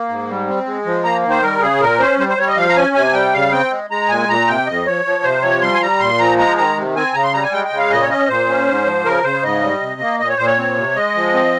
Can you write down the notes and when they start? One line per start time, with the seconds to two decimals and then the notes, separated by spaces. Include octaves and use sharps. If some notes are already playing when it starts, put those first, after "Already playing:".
Already playing: A#3
0.09 G#2
0.29 G3
0.47 C4
0.66 G#3
0.86 F3
1.04 A#3 A#5
1.24 D#3
1.31 C5
1.42 G3 A#4
1.61 C#3 G#4
1.80 A#2 A#4
1.99 C#4 C5
2.19 G3 C5
2.29 C5
2.38 G3 C#5
2.48 D#5
2.57 F3 F5
2.69 A#5
2.76 C#4 G#5
2.95 C3 G#5
3.14 G3 G5
3.33 C#3 F5
3.52 C4 G5
3.71 G#3
3.90 G#3 A#5
4.09 A#2 G#5
4.29 A#2 A#5
4.48 C3 G5
4.67 F2 D#5
4.86 F3 C#5
5.05 F3
5.23 C3 C5
5.42 F3 C#5
5.62 G3 C6
5.73 G#5
5.81 G3 A#5
6.00 A#2 C6
6.19 F3 A#5
6.38 G#3 A#5
6.58 D#3 A#5
6.77 C3
6.96 C4 G#5
7.14 C#3 A#5
7.23 C6
7.33 G3 A#5
7.43 G#5
7.52 G#3 G5
7.65 G5
7.71 C#3
7.78 F5
7.90 A#2 D#5
8.02 C#5
8.09 C#4 D#5
8.29 A#2 C5
8.48 C#4
8.68 G#2
8.85 F3
9.05 C#3 A#4
9.24 C#3 C5
9.43 G#2 D#5
9.62 G3
9.81 C3
10.01 A#3
10.20 A#2 D#5
10.29 C#5
10.37 A#2 C5
10.46 C#5
10.58 C4
10.77 C3
10.95 G#3 D#5
11.15 F3
11.34 C4